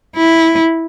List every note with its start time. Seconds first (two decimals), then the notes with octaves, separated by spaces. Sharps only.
0.16 E4